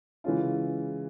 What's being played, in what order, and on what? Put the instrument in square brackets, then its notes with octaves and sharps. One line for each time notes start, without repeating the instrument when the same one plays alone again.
[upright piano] C#3 E3 G#3 C#4 F4